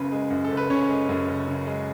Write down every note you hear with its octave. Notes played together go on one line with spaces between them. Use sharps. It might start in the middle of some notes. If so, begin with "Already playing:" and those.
Already playing: F#1 F#2 C#3 B3 B4
G#3
F#2
A4
F#1
B4
C#3 C#4 C#5
G#3
F#2
F#1
C#3
G#3